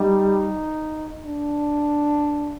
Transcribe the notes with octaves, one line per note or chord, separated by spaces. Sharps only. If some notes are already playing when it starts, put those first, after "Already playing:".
Already playing: G3 D#4
D4